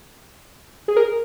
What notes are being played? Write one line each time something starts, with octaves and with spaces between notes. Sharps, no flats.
G#4
A#4